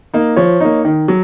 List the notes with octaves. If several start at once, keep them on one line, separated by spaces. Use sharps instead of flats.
A#3 D#4
F3 C#5
A#3 D#4
D#3
F#3